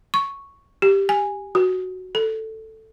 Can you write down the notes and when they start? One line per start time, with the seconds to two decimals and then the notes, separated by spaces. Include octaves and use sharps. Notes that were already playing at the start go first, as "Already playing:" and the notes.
0.14 C#6
0.82 G4
1.09 G#5
1.55 F#4
2.15 A4